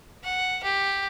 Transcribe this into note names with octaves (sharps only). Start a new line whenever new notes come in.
F#5
G4